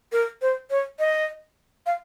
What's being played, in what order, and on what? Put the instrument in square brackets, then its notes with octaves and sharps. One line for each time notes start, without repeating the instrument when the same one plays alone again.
[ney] A#4
C5
C#5
D#5
F5